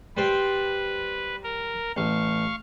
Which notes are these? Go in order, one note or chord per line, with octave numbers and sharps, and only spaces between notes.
G3 B4 C5 G5
A#4
A1 F5 C#6